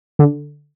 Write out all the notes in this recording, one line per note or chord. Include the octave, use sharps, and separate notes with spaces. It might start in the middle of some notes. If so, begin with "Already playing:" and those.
D3